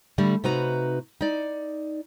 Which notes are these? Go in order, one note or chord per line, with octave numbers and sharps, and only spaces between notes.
D3 G3 A3
C3 D#4 F#4 B4 A#5
D#4 D5